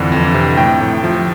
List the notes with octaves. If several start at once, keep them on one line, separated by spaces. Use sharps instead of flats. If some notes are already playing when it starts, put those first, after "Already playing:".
Already playing: F2 D3 E3
F2
C3
A2 G5
A2
F3